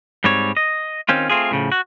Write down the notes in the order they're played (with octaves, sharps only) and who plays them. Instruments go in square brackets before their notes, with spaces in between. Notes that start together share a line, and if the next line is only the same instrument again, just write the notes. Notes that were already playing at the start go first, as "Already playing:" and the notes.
[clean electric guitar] G#2 G3 C4 C#5
D#5
D#3 C4 C#4 F4
A3 C4 F4 G#4
A2 C#3 F3
F#4